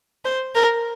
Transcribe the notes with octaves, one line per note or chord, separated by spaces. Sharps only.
C5
A#4